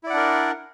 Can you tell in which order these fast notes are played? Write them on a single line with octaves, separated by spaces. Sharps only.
E4 D5 F#5 D4 A#4